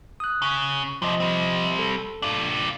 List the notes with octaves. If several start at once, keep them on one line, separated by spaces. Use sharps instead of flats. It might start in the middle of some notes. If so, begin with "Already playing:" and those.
D#6 F#6
C#3
D#2 C3 F3 D#5
G3 C4
A4
D4 F4